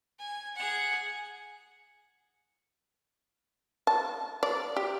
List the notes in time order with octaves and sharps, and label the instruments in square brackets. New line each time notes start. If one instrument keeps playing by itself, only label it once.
[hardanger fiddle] G#5
G#4 F#5
[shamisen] A5
D5
G4